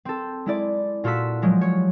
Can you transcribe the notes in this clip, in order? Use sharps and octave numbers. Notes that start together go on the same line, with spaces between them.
C4 A4
G#3 E4 D5
A#2 F4 F#4 A4 E6 B6
F3 F#3 G#3
C#5